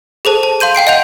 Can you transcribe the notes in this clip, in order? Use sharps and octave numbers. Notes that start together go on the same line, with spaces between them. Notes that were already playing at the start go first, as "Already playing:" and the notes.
G#4 A4 C5 A5
A5
F5 C6 G6 D#7
F5 G5 C7 D7
D#5 F5 F#5 G6 F7